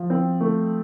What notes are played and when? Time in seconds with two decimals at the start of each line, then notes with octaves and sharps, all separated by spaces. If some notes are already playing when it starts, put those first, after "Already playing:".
Already playing: F3
0.10 C4
0.41 A3